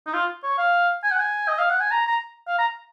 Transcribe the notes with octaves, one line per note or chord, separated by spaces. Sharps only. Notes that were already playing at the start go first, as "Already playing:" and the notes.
D#4
F4
C#5
F5
G#5
F#5
G#5
D#5
F5
F#5
G#5
A#5
A#5
F5
A#5